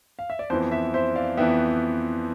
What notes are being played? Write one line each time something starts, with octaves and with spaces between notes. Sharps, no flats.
F5
E5
D5
F2 E3 B3 C5
C5 E5
C5 E5
D5 F5
F2 E3 B3 E5 G5